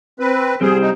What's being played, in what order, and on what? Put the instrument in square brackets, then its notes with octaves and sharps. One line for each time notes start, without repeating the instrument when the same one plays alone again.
[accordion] C4 B4
[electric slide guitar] G3 C4 [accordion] G#4
[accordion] D#4